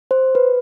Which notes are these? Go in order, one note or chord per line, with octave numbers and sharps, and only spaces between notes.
C5
B4